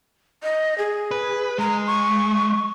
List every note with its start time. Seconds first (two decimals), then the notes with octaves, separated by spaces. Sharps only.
0.43 D#5
0.78 G#4
1.11 B4
1.58 G#3 A#5
1.86 C#6